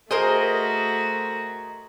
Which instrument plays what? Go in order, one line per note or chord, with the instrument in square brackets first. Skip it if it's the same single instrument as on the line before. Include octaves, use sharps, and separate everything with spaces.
[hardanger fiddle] A3 F#4 [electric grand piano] G#4 C5 [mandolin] A#4 D#5